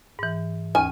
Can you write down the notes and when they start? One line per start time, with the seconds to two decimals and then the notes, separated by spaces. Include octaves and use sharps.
0.19 G#2 E3
0.75 D#2 C#4 G#5 F6